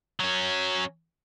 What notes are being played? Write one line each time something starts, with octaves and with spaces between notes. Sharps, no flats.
F#3 C#4